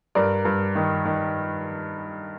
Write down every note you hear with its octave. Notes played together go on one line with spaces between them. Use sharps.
G2 A#4 D5
G2
D#3
D#3